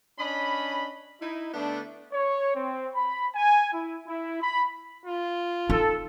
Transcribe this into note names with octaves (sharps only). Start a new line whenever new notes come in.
C#4 D4 D#5 B5
D#4 E4
D3 A3 B3 D4
C#5
C4
B5
G#5
E4
E4
B5
F4
D#4 A4